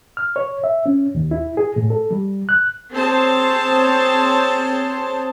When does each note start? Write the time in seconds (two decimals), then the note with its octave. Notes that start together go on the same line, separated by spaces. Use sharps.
0.17 F6
0.36 C#5
0.64 E5
0.86 C#4
1.15 D#2
1.31 E4
1.57 G#4
1.76 A2
1.90 A4
2.11 G3
2.49 F#6
2.94 C4 G#4 C5 C#5 A5